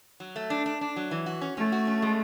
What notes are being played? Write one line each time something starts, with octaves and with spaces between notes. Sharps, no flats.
F#3
A3
D4
D4
D4
F#3
E3
F#4
C#4
A3 C#4
F#4
C#4
G#3